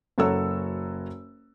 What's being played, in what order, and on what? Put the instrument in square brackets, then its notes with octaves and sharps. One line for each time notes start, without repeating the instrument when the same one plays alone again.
[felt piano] F#1 F#3 F#4 A4 C#5 E6